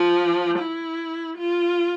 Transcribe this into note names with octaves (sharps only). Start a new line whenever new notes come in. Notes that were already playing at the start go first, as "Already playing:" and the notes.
Already playing: F3
E4
F4